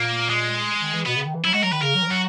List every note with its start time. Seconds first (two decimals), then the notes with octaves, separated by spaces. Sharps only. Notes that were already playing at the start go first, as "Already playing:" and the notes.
Already playing: A#2 A#3
0.30 G#3
0.81 D#3
0.94 E3
1.06 B2 B3
1.16 C#3
1.26 D#3
1.35 E3
1.45 F#3 E4
1.54 G#3 F#4
1.63 F#3 A#4
1.73 D#3 B4
1.82 C#3 A#4
1.95 F#3
2.03 E3
2.08 F#3 F#4